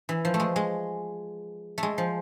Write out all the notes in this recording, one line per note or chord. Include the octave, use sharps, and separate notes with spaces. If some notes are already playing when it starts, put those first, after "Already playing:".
E3
F3
A3
G#3
G#3
A3
G#3
F3